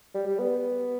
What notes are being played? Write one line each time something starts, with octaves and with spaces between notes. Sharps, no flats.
G3
G3
B3